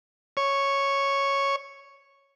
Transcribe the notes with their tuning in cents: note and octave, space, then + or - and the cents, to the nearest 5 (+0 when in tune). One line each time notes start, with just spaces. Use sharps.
C#5 +0